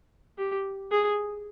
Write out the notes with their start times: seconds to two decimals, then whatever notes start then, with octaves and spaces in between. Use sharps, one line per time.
0.38 G4
0.91 G#4